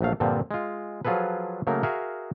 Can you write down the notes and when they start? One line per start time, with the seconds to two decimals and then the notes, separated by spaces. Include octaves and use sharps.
0.01 A#1 F#3 A3 F5
0.20 G2 A#2 D3 F3 C4
0.51 G#3 F4
1.05 F3 F#3 F4 G#4 A4 B4
1.67 C#3 F#3 A3 A#3 A#4
1.83 F#4 G#4 A#4 E5 F5